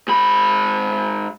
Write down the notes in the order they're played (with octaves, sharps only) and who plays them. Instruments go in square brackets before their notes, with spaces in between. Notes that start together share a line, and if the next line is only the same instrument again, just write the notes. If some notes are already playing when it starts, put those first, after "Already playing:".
[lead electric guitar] G#2 B5